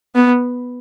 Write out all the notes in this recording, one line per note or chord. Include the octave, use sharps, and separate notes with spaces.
B3